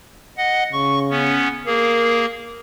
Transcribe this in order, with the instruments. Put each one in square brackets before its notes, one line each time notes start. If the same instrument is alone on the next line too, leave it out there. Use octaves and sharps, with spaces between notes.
[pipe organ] D#5 F#5
[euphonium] C#3 [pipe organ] C#6
[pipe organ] B3 C#4
[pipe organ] A#3 G#4 [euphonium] A#4